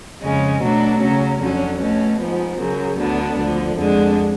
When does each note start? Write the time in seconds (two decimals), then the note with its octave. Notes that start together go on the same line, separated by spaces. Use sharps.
0.22 F2 C#3 G#3 C#4
0.61 B2 F#3 A3 D4
1.01 C#3 F#3 C#4
1.41 F2 D3 F#3 C#4
1.80 B2 A3 C#4
2.20 G#2 F3 B3
2.59 F#2 C#3 F#3
2.98 D2 D3 F#3 B3 D4
3.39 D2 D3 F3
3.77 F2 D3 G#3 D4